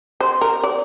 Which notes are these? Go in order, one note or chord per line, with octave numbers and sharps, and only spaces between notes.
C5
A#4
D5